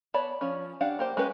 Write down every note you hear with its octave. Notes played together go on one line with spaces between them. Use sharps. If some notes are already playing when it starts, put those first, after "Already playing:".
B3 C#5 D5 A5 B5
F3 C#4
C#4 D4 G4 F5 F#5
A#3 G4 C5
G#3 C#4 G4 B4